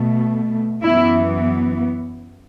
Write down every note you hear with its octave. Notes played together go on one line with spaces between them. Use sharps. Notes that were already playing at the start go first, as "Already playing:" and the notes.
Already playing: B2 A3
F#2 E3 B3 E4